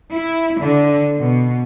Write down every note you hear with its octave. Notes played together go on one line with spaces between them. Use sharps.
E4
D3
B2